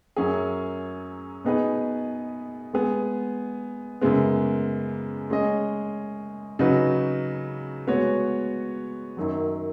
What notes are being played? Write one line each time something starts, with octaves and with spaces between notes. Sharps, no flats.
F#2 F#3 C#4 G#4
B2 B3 D#4 G#4 B4
G#3 B3 G#4
F#2 C#3 G#3 B3
G#3 C#4 G#4 D#5
C#3 F#3 D#4 F#4 B4
G#3 B3 F#4 C#5
F#2 D#3 F#3